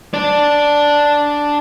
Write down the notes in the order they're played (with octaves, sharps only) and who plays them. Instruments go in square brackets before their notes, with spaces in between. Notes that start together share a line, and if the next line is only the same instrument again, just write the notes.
[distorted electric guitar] D4 D5